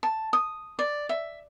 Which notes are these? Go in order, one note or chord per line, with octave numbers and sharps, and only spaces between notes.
A5
D#6
D5
E5